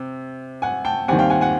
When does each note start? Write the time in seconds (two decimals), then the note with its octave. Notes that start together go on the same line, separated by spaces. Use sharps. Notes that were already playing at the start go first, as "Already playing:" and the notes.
Already playing: C3
0.62 F#5 G#5
0.85 G5 A5
1.08 D#2 D#3 G3 C4 F#5 G#5
1.19 F5 G5
1.30 F#5 G#5
1.41 F#5 G#5